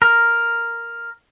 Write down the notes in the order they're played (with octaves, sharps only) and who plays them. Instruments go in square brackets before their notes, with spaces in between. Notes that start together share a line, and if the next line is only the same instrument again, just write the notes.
[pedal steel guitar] A#4